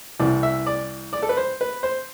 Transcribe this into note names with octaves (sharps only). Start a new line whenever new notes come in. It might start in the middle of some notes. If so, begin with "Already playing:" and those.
C2 C3 E3 D5
E5
D5
D5
A4
B4
C5
B4
C5